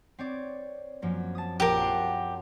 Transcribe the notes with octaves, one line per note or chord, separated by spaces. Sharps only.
C4 C#5 D5
F#2 F3 A#3
A5 D#6
A#1 G4 A#4 A5
F#5 A5 C6